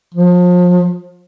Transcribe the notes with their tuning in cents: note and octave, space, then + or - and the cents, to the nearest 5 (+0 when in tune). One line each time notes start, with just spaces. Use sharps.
F3 +35